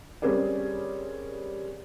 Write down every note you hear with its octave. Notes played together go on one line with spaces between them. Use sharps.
G3 C4 C#4 G#4 A#4 D5